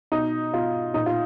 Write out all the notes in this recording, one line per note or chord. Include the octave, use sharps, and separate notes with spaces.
B2 D#4
B2 F4
A#2 D#4
F4